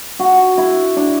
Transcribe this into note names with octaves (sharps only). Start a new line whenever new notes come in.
F#4
E4
D4